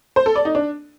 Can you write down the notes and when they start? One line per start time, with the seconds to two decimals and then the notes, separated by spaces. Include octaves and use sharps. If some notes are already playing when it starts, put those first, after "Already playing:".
0.16 C5
0.26 A4
0.36 D5
0.45 D#4
0.55 D4